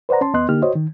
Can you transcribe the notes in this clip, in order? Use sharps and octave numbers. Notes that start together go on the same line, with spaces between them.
B4 C5 D5 F#5 A#5
C#4 A5 C6
D#2 B3 D#5 C6 F#6
D3 A#3 D#4 G4 F6
F#4 C5 C#5 D#5
D#3